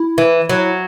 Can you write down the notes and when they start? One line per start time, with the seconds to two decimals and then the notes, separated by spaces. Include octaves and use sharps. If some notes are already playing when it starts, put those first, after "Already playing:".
Already playing: E4
0.18 E3
0.49 F#3